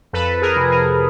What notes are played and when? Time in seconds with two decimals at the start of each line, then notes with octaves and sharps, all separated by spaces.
0.13 F2 A4 B4
0.42 G#4 A#4
0.56 C3
0.71 G#4 A#4